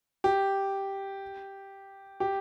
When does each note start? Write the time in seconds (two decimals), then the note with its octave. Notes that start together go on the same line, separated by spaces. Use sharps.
0.24 G4
2.20 G4